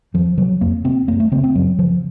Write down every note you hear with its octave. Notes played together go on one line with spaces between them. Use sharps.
F2 F3
C3 F#3
F2 A#3
C3 C4
F#2 A#3
A3
C#3 C4
C4
F#2 F#3
C#3 F3